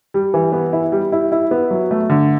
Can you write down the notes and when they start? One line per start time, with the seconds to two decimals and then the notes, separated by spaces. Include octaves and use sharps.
0.14 G3
0.34 E3
0.52 B3
0.73 E4
0.92 G3
1.12 E4
1.32 E4
1.51 B3
1.70 F#3
1.91 A3
2.10 D3